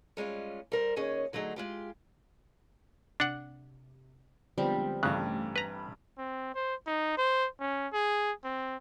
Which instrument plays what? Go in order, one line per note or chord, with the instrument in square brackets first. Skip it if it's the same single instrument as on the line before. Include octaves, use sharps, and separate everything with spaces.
[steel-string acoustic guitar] G3 G#3 C#4 F4
G3 A#4 C5
D#2 C#4 G#4 C#5 D#5
D3 F#3 A3 D#4 G#4
G#3 F4 G4
[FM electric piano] C3 [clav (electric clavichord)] D4 F#5
[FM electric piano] D3 G#3 B3 [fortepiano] F3 [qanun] G3 C4
[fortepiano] A1 G2 F#6 [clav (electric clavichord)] C#3 [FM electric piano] A3 F5
[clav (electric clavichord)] B4 A#5 [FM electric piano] B5
[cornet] C4
C5
D#4
C5
C#4
G#4
C4